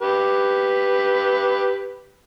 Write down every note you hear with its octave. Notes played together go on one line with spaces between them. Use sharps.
G4 B4